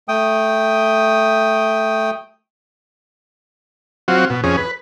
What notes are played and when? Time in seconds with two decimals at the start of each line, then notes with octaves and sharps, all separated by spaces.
0.08 A3 G5 D#6
4.08 F#3 C4 F4 F#4
4.30 B2
4.44 F2 C#4 G#4
4.57 B4